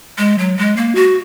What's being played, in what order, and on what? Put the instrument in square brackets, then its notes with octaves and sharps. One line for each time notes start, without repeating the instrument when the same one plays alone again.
[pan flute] G#3
F#3
G#3
A#3
F#4